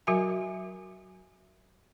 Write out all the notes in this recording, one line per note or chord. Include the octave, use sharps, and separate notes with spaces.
F#3 F#4 A#4 E5 G#5